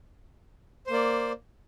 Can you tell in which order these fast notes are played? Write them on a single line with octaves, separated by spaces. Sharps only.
C5 A#3 D5